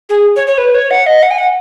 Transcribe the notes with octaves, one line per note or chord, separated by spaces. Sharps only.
G#4
C#5
C#5
B4
C#5
F#5
D#5
F#5
G#5
F#5